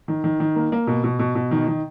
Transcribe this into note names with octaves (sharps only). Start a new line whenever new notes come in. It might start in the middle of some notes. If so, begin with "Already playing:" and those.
D#3
D#3
D#3
A#3
A#3
B2
B2
B2
B2
D#3
D#3